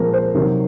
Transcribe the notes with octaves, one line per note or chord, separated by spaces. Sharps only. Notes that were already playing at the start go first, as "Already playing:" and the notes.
Already playing: A#2 F3 G#3 C4 A#4
C5
C3 D#3 F#3